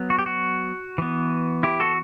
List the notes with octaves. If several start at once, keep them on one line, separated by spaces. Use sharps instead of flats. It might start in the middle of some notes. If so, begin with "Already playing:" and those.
Already playing: F#3 B3
F#4
G4
F#4
E3 B3
E4 G4
F#4 A4